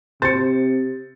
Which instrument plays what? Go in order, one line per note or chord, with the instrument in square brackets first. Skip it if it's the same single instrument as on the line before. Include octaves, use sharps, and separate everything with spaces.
[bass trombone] C3 [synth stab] C5 [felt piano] A6 C#7